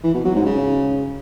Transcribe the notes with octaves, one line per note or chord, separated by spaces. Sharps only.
E3
B2
F#3
G#2
C#3